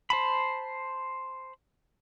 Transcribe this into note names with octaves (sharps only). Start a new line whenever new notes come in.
C5 A5 B5